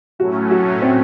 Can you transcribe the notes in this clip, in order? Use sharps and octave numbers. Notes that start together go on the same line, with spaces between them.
A2 F#3 A3 C#4 F#4
F#4
C4